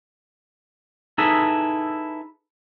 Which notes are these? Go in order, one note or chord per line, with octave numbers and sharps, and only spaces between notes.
D#4 E4 G#4 A4 B4